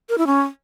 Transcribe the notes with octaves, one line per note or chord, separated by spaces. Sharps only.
A#4
E4
C#4